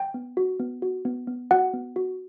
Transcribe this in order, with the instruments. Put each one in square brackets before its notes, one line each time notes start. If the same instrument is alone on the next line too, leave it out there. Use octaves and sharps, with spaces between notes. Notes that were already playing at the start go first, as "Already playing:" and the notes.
Already playing: [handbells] G5
B3
F#4
B3
F#4
B3
B3
F#4 F#5
B3
F#4